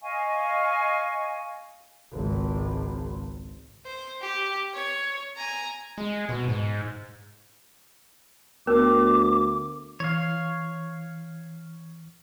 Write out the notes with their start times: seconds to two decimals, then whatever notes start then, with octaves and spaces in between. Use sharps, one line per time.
0.01 D#5 F5 G#5 C#6
2.12 G#1 C#2
3.86 C5
4.22 G4
4.75 C#5
5.36 G#5 A#5
5.98 G#3
6.29 B2
6.48 G#2
8.67 D2 B3 A#4 D6
10.00 E3 C#5 F5